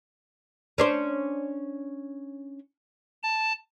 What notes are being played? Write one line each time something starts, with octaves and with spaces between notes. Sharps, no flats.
C#4 D4 C5
A5